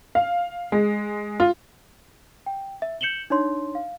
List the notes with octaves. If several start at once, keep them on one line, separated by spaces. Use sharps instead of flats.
F5
G#3
F4
G5
E5
G6 C#7 E7 F#7 G7
D4 D#4 C#5 C6
F5